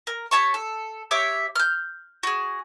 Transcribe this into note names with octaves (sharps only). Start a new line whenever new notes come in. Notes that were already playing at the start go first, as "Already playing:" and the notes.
A#4
G4 C#5 A5 C#6
A4
G4 C#5 E5 D6
F6 G6
F#4 G#4